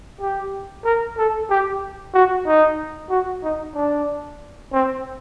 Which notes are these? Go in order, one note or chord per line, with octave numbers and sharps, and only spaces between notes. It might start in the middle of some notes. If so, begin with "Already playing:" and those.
G4
A#4
A4
G4
F#4
D#4
F#4
D#4
D4
C4